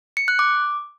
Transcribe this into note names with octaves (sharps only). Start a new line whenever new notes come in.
C#7
F#6
D6